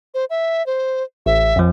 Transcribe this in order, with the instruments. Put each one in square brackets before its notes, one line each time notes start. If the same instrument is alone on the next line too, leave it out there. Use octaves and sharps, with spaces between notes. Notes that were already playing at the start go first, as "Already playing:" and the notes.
[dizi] C5
E5
C5
[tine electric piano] A1 [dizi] E5
[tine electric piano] F2 F3